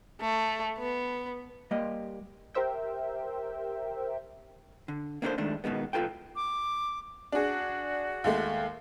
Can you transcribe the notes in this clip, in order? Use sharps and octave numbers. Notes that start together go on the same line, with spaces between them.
A3
B3
G3 A#3 G4 D#5
G4 A#4 C5 E5 G5
D3
A#3 B3 D4 E4 A4 C5
D#3 G#3 A3 D4
G#2 B2 D#3 G#3 B3
B1 F4 A4 B4 G5
D6
D4 F#4 G#4
D#2 G#3 A3